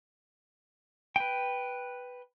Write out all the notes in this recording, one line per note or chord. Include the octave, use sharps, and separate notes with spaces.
B4 G5